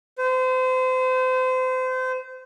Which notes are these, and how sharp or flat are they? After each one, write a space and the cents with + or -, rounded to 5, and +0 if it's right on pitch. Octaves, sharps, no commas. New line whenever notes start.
C5 -30